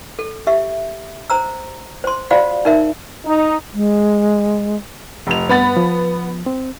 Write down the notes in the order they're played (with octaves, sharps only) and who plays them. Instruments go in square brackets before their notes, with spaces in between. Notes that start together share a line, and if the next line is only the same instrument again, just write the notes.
[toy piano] A4
G4 E5
C5 A#5 E6
C5 C6
F4 F#4 C5 D5 F5 F#5
D#4 A#4 E5
[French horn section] D#4
[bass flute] G#3
[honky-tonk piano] F1 F7
[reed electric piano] G2 F#5 [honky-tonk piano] B3 B5 A6
[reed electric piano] F3
C4